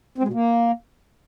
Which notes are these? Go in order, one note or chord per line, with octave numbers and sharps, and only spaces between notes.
C4
G#3
B2
A#3